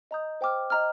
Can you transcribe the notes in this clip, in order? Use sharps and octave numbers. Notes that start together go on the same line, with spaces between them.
D#5 A#5 D#6 G6
C5 G5 D6 F6
D#5 A#5 F6